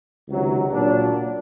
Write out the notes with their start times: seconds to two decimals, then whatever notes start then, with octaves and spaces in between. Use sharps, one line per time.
0.28 C#2 C3 D#3 F#3
0.71 A#2 F#3 A#3 D4